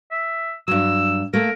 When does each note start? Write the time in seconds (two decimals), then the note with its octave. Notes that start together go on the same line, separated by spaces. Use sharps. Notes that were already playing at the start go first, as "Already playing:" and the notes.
0.11 E5
0.68 G2 F#3 E6
1.33 A3 A#3 A#4